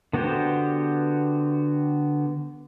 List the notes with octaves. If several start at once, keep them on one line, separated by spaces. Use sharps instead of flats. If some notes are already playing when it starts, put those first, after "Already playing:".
D3 B3 F#4 G4 C5